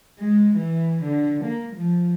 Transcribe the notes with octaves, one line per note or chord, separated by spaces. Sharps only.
G#3
E3
D3
A#3
F3